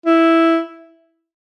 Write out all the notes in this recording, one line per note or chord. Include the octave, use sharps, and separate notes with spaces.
E4